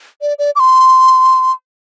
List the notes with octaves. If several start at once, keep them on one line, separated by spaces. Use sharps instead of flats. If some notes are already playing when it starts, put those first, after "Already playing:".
D5
D5
D6
C6